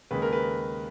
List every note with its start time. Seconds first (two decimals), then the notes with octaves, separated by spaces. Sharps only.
0.11 D#2 C#3 G#3 B4
0.22 A#4
0.32 B4